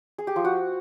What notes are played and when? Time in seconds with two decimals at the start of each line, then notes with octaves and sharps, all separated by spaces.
0.18 G#4
0.27 G4
0.36 F3
0.45 F#4